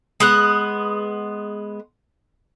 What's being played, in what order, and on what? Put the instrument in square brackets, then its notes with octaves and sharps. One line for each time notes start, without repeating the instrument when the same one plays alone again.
[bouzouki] G#3 B3 F#5